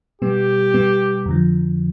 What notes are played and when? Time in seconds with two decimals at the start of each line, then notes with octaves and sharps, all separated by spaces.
0.22 B2 G3 B3 G4
0.74 B2 G3 B3
1.26 F2 D3 F3